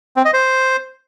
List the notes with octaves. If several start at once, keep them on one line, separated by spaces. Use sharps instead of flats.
C4
D#5
C5